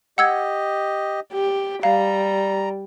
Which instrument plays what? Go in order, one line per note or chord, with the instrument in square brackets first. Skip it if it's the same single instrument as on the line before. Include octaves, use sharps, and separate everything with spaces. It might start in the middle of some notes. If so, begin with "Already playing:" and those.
[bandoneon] G4 D#5 [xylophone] F#5 E6 G#6
[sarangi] G4
[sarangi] G3 [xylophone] F5 [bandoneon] A#5